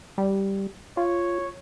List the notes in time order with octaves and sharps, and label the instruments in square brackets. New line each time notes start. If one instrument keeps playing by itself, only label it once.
[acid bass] G3
[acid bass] F4 [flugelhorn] C#5